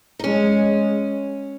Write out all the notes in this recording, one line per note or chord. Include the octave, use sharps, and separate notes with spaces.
D#4
G#3 C#4